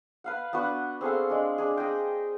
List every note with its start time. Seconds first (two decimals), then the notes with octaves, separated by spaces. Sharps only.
0.24 B4 F5 F#5
0.53 B3 D4 F#4 B4
1.01 C4 G#4 A4 F5
1.30 G#3 D4
1.58 D4 G#4
1.77 G#4 D#5 G5